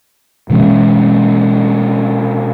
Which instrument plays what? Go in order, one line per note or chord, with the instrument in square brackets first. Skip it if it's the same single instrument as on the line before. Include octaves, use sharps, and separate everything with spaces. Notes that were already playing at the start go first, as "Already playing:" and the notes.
[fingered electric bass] B2 E3 G#3 C#4